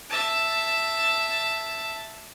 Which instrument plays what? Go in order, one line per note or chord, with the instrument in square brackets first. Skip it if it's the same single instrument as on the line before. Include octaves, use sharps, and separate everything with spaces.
[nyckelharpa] E5 A5